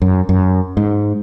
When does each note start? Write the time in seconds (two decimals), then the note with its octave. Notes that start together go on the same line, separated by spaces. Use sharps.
0.02 F#2
0.29 F#2
0.77 G#2